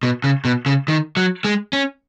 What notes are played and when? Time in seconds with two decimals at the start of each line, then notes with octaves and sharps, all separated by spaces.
0.03 B2
0.24 C#3
0.45 B2
0.66 C#3
0.88 D#3
1.17 F#3
1.44 G#3
1.73 C#4